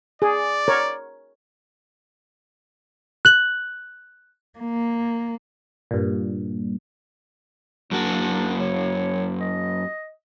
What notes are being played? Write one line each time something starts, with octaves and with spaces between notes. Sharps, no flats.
G#4 D5
A#4 C#5
F#6 F#7
A#3
G2 A#2
F#2 A#3 D4 F#4
C#5
D#5